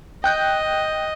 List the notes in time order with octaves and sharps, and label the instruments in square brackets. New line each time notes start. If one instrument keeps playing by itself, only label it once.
[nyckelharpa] D#5 [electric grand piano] G5 F#6 G6